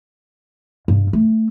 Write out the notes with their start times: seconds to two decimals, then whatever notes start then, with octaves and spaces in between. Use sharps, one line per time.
0.88 G2
1.13 A3